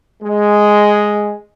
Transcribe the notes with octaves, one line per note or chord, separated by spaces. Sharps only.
G#3